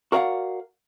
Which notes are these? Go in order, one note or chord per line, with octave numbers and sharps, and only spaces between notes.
F#4 A#4 D5 D#5 F5 F#5